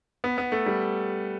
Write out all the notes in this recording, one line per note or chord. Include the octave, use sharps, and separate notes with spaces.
B3
B3
A3
G3